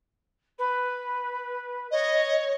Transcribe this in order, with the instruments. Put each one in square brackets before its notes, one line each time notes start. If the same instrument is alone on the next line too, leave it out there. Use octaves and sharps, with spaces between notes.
[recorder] B4
[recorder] C#5 [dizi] D#5